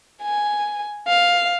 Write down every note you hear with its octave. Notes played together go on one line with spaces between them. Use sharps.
G#5
F5